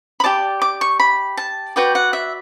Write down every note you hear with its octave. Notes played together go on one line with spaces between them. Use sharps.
B5
G4 D5 A5
D6
C#6
B5
A5
F#4 B4 D5 G5
F#5
E5